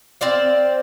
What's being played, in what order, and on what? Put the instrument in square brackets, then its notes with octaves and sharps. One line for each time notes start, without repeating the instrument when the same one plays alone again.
[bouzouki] C4 C5 D5 F5